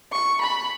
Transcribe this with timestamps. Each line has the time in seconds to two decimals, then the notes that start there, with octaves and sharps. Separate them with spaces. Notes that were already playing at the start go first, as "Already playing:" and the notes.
0.12 C#6
0.41 B5